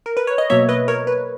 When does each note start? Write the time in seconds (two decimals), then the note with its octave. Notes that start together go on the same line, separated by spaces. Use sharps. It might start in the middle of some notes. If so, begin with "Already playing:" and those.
0.06 A#4
0.17 B4
0.27 C#5
0.38 D#5
0.50 B2 F#3 A#3 C#5 E5
0.69 B4 D#5
0.88 A#4 C#5
1.07 B4